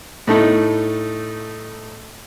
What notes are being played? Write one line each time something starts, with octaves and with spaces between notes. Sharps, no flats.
A2 A3 D#4